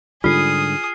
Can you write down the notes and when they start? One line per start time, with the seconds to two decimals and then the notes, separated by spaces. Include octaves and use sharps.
0.24 G#2 D3 G3 F4 G#4 D#6 F6 C7